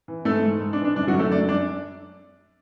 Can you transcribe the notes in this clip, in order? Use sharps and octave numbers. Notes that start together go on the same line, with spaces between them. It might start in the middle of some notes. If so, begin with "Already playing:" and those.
E3
G#2 A3 A4
G#2
G#2
D4
E3
D4
F#2 D4
F#3 F#4
F#2
A3 A4
F#2 D4 D5
F#2 D4 D5